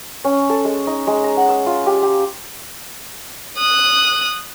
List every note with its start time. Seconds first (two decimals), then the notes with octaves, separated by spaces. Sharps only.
0.24 C#4
0.50 A4
0.65 G#3
0.87 D#4
1.07 G#3
1.24 A#5
1.37 F#5
1.49 E6
1.66 F4
1.86 G4
2.02 G4
3.58 D#6 F#6